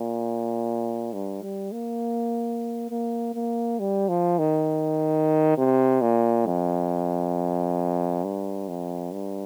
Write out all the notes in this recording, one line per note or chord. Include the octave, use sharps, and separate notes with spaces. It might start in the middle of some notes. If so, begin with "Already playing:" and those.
Already playing: A#2
G2
G3
A#3
A#3
A#3
G3
F3
D#3
C3
A#2
F2
G2
F2
G2